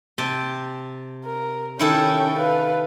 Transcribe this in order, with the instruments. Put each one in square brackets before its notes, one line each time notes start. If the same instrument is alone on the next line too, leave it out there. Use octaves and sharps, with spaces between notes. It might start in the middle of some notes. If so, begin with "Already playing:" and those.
[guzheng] C3 G5 A5
[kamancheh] A#4
[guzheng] D#3 E4 A4 [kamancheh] C#4 G5
[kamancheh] B4 F5